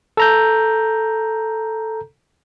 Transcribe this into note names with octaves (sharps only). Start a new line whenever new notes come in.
A4 A#5 G6